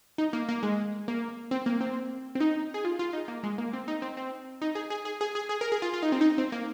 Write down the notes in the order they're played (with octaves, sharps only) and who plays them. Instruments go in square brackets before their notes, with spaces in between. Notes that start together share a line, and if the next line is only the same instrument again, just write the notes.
[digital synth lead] D#4
A#3
A#3
G#3
A#3
C4
A#3
C4
C4
D#4
G#4
F4
F4
D#4
A#3
G#3
A#3
C4
D#4
C4
C4
D#4
G#4
G#4
G#4
G#4
G#4
G#4
A#4
G#4
F4
F4
D#4
C4
D#4
C4
A#3